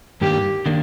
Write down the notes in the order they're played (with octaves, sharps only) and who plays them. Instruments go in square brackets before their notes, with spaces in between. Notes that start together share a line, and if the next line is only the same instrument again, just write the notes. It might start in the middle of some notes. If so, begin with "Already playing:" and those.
[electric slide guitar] G2 D#3 A#3 D4 [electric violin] G4
[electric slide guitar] D#3 A#3 D4